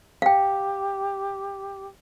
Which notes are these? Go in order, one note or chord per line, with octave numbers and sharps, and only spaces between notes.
G4 F5 G5